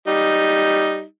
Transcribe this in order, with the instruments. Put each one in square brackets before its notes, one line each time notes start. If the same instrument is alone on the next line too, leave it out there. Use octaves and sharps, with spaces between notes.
[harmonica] G3 D#4